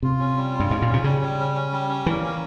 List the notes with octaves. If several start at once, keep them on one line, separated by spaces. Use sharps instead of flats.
C3 F4
C#4
G3
F4
G2
G#2 C#4
A#2
C#4
C3
C#3 G3
G3
C#4
C#4
G3
C#4
E3 A#3
C#4